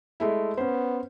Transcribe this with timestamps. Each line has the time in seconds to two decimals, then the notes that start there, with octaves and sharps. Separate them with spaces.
0.20 G#3 A3 E4
0.57 B3 C#4 C5